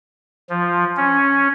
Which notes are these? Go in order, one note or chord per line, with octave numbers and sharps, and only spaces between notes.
F3
C#4